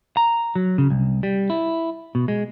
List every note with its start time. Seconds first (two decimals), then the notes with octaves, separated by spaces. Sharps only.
0.17 A#5
0.55 F#3
0.78 C#3
0.90 C2
1.23 G3
1.50 E4
2.15 B2
2.28 G#3